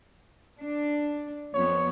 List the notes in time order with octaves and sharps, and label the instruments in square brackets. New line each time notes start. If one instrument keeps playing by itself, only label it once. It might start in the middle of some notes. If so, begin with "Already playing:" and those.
[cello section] D4
[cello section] F2 B3 [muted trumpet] C#5